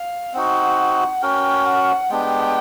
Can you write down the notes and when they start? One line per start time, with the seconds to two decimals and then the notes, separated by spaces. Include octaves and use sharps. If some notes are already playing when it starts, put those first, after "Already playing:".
Already playing: F5
0.34 C4 D#4 F#4 F#5
1.22 C#4 F#4 A#4 G5
1.66 F#5
2.10 G#3 B3 D4 G4 G5